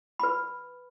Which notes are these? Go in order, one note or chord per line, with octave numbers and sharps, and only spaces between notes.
B4 B5